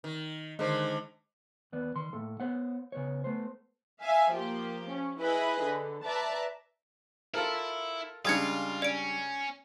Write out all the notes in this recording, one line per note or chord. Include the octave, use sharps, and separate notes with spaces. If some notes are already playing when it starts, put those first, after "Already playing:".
D#3
D3 D#3 G#3 C5
D#2 B3 D5
D#3 C6
A2 A#3 A4
B3 C5 C#5 F#5
C#3 B3 C#5
A3 B3 C5
E5 F5 G#5
F3 A#3 G4
C#4
E4 G#4 B4 D#5 B5
D3
B4 D5 E5 A5 A#5
E4 F4 A4 A#4
C#3 G3 G#3 D4 F4 D#6 G#6 C#7
C#4 D5 D7